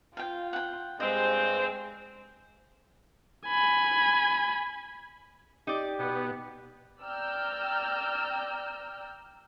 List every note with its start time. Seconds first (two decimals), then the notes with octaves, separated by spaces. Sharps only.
0.17 F4 F5 G5
0.53 F#5 G5
1.00 G2 G#3 C4 C5 D#5
3.47 G#5 B5
5.67 D#4 G4 D5
5.99 B2 B3
7.02 D5 G5 A#5 E6 F6 G6